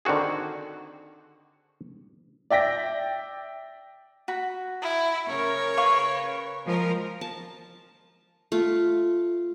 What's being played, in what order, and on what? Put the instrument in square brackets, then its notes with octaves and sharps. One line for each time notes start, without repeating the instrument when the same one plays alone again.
[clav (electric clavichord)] D3 D#3 C4 F#4 G#4
[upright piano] D5 E5 G5 A#6 B6
[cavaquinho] F#4 B5
[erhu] E4
[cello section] C#3 A#4 [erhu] C#5
[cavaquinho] B4 F5 C#6
[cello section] F3 G#3 A#4
[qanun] A5
A3 F4